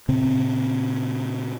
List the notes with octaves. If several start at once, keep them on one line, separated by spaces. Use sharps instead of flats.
A#2 C#3 C4